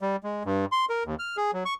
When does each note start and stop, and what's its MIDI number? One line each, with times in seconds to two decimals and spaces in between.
0.01 0.16 55
0.23 0.43 56
0.45 0.65 43
0.72 0.85 84
0.90 1.03 70
1.05 1.15 39
1.19 1.37 89
1.37 1.51 68
1.53 1.64 54
1.66 1.74 85